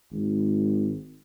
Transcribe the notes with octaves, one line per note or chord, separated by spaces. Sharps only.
G#1